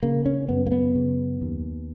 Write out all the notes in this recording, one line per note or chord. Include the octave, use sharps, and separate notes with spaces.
C#3 A#3
C#4
F#2 B3
A#3
B3
C#3
D#2